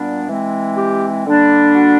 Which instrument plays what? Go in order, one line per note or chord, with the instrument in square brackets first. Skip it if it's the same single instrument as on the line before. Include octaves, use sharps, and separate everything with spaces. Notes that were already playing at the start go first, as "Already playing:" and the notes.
Already playing: [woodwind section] A#2 G3 B3 D4
E3 G#3 C4
G4
D3 G3 A#3 D4
F#4